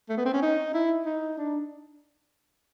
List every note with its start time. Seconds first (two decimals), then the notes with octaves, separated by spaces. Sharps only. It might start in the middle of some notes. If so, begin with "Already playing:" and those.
0.09 A3
0.17 B3
0.25 C4
0.33 C#4
0.42 D#4
0.74 E4
1.06 D#4
1.38 D4